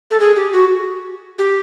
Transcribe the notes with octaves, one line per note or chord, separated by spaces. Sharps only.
A4
G#4
G4
F#4
G4